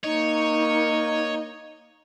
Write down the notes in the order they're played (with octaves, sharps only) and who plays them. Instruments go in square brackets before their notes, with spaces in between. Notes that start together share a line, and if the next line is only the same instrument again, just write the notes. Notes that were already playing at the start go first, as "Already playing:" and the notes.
[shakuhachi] A#3 [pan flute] D#4 [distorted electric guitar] C#5 [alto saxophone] D#5